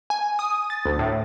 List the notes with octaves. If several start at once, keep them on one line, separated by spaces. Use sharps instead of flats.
G#5
D#6
A6
D2
A2